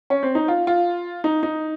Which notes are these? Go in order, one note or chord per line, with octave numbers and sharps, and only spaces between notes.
C#4
C4
D#4
F4
F4
D#4
D#4